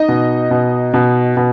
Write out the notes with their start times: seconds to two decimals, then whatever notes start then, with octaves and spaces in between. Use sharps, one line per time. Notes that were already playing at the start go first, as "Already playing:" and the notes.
Already playing: D#4 D#5
0.08 B2
0.51 B2
0.94 B2
1.37 B2